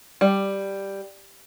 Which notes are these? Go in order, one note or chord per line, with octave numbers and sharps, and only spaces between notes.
G3